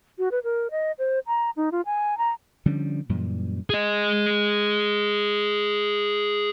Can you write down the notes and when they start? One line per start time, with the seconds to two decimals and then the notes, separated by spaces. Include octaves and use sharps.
0.18 F#4
0.31 B4
0.44 A#4
0.71 D#5
0.99 C5
1.27 A#5
1.56 D#4
1.72 F4
1.86 G#5
2.18 A#5
2.66 D3 F3 G3 C#4
3.09 F#2 A#2 E3 G3
3.70 G#4 D#5